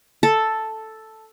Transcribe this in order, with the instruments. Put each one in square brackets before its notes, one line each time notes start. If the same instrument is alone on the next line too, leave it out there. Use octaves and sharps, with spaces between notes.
[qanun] A4